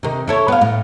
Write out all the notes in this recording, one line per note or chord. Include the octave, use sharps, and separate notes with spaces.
C3 D#3
E4 A4 C#5
B3 F5
A2